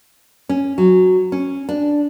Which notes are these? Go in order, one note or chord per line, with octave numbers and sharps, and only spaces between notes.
C#4
F#3
C#4
D4